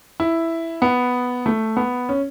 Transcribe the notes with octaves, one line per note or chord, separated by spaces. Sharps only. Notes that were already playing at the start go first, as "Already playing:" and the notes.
E4
B3
A3
B3
C#4